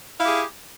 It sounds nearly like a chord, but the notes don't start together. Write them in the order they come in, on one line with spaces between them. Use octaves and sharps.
E4 F5 G4 G#4